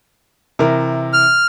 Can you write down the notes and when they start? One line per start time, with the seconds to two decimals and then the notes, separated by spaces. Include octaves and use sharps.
0.59 C3 E3 A#4
1.13 F6